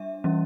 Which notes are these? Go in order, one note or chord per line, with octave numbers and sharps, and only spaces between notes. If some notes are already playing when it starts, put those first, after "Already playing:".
Already playing: G3 D4 E5
E3 G3 C#4